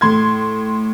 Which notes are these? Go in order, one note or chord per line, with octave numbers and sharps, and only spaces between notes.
A2 C6 G#6